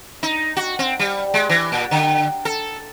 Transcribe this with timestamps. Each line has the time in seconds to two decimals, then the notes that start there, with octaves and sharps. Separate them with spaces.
0.23 D#4
0.57 F#4
0.79 C4
0.99 G3
1.34 G#3
1.49 E3
1.72 A#2
1.91 D3
2.45 A4